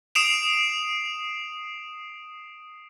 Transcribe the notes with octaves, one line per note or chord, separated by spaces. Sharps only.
D#6 C7 D7 E7 F7